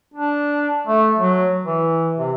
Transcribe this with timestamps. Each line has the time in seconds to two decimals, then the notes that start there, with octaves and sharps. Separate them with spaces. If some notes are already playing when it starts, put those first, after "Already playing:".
0.14 D4
0.87 A3
1.18 F#3
1.65 E3
2.18 C3